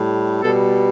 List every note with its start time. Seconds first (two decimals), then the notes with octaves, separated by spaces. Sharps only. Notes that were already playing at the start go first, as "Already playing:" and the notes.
Already playing: A2 G3
0.42 B2 G3 A4